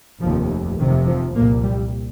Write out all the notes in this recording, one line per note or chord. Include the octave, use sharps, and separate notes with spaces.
F1 D#2 F3
F1 F2 C3 D#3
F3
C2 A#2 A#3
G3